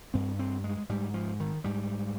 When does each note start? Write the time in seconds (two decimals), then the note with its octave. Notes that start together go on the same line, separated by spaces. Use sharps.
0.14 G2 C4
0.39 C4
0.64 G#3
0.89 G#2 G3
1.14 F3
1.40 D#3
1.64 G#2 G3